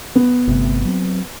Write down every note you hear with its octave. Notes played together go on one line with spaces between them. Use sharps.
B3
G1 C3 A3
F#3 C4